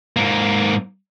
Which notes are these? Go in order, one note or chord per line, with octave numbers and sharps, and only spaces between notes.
G#2 A#3